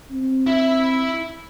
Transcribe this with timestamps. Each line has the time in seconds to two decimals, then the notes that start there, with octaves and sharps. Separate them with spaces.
0.11 C4
0.46 E4 E5